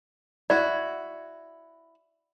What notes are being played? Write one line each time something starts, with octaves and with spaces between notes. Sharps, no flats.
E4 F#4 D5